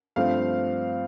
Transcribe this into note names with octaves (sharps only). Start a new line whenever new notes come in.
G2 F3 A3 C4 F5